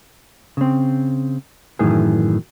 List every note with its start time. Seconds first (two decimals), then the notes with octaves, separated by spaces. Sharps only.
0.57 C#3 C4
1.79 F#2 A2 D#3 E3 G#4